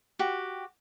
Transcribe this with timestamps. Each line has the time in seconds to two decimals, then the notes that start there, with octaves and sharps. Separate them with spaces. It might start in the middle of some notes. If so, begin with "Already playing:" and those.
0.19 F#4 G4